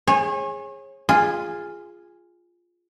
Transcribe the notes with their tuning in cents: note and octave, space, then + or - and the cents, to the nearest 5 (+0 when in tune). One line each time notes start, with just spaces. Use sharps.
G#4 -10 C#5 -35
F4 +0 G#4 -10